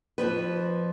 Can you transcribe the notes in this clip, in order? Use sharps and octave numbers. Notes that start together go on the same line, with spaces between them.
F2 A#2 F3 B4